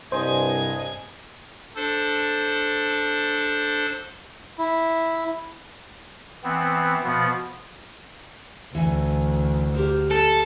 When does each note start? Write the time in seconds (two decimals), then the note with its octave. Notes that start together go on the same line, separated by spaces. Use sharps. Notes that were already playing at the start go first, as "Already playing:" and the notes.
0.12 C2 G2 C5 D#5 G#5
1.76 D4 A4 C5
4.58 E4
6.44 E3 B3 C4
7.04 B2 F3 B3
8.75 D2 E3 G#5
9.75 G4 A#4 C5
10.11 A4